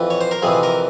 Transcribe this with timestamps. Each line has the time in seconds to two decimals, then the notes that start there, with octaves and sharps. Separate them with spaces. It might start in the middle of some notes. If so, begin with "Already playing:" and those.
Already playing: F2 E3
0.10 C#5
0.21 C5
0.31 A#4
0.42 F2 C3 E3 G#4
0.63 A#4